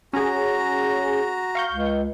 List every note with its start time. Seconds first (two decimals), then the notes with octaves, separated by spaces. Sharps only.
0.13 C#4 F#4 G#4 A#5
1.55 F5 C#6 G6
1.72 C#2